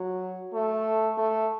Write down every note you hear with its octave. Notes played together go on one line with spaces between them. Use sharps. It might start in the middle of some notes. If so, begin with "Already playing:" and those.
Already playing: F#3
A3
A3